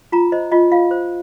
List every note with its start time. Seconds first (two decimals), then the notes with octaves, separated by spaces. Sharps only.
0.12 F4 A#5
0.32 C5 D#5
0.52 F4 D#5
0.72 F4 F5
0.91 C5